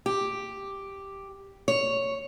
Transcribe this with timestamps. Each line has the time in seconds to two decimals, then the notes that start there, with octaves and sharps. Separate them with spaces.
0.06 G4
1.68 C#5